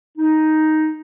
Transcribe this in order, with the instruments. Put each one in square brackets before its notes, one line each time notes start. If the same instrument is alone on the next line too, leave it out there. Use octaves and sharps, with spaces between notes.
[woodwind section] D#4